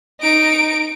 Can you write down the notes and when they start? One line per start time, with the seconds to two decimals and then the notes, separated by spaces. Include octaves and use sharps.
0.21 D#4 D7